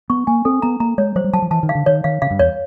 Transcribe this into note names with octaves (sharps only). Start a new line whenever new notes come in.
B3 C#6
A#3 G#5
C4 A4
B3 A#5
A#3 A#5
G#3 C#5
F#3 C5
G3
F#3 A5
F3
E3 A5
D#3
F5
D3
D#3 C#5
D#3 F5
C#3 F5
G2
E2 C#5